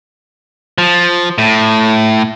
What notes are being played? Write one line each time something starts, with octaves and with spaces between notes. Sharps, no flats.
F3
A2